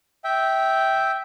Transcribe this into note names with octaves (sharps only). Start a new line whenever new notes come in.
E5 G5